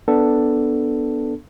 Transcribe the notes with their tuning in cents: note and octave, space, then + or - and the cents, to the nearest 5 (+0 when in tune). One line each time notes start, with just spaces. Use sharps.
B3 +0 D4 +0 A4 +5